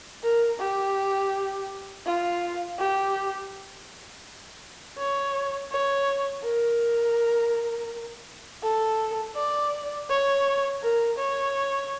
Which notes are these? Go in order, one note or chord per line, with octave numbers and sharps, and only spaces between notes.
A#4
G4
F4
G4
C#5
C#5
A#4
A4
D5
C#5
A#4
C#5